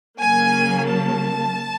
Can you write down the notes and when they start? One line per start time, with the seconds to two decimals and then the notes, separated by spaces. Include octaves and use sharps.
0.19 C#3 F#3 A#3 G#5
0.88 A5